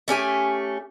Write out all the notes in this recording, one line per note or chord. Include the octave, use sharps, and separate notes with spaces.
A3 C#4 G4 G#5